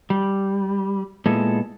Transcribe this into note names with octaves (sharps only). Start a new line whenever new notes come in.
G3
A#2 G#3 B3 E4 G#4 A4